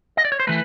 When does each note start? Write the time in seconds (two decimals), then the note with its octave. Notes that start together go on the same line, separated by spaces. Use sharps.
0.17 D#5
0.25 D5
0.32 C#5
0.40 C5
0.47 E3 A3 B4